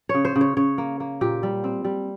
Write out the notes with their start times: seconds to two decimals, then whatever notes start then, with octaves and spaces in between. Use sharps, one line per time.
0.09 C#5
0.14 C#3
0.25 C5
0.36 C#3
0.41 C#5
0.57 C#3 C#5
0.78 A#3
1.00 A#3
1.21 A#2 G4
1.43 G3
1.64 C4
1.84 G3